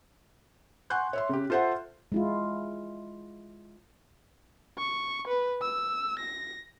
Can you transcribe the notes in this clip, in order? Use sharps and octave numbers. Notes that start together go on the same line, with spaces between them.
F#5 G#5 C6 C#6 F#6 G6
C#5 E5 C6
C#3 G4
F4 A4 C5 E5 F#5
G#3 E4 F4
C#6
B4
E6
A#6